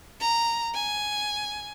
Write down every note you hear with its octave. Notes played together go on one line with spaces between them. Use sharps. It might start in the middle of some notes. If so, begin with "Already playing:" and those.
A#5
G#5